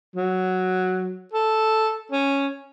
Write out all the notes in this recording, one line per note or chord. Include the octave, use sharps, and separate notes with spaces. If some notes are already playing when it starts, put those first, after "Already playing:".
F#3
A4
C#4